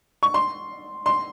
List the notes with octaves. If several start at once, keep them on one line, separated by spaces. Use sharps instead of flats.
C#6
C6
C6